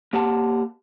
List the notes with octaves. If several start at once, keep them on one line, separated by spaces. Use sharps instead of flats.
A#3 G4 F#5 A5